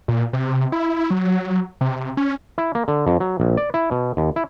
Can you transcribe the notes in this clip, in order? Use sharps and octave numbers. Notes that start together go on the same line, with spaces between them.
A#2
C3
E4
F#3
C3
C#4
E4
A#3
D3
F2
F#3
A#1
D5
E4
B2
D#2
E4